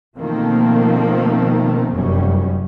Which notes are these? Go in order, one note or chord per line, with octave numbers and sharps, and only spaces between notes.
B2 D#3 F3 A3 A#3 C4
F1 F#2 G3 C#4